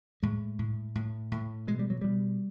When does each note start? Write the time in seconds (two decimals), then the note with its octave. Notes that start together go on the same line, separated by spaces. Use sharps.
0.23 A2 G#3
0.59 A2
0.95 A2
1.32 A2
1.67 B2 G#3
1.79 G3
1.90 F#3
2.01 B2 G3